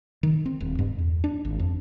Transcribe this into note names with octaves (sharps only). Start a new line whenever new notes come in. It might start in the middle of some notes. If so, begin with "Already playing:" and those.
D#3
C4
D#1
G2
E2
D4
G#1
F2